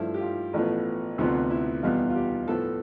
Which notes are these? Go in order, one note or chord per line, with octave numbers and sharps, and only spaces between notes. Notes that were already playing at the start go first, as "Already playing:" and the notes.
Already playing: G2 F3 A3 E4
G4
F4
A1 A2 F3 B3
D2 C3 F3 B3
E4
E2 B2 G3 B3 F4
F4
G4
A2 F3 B3 A4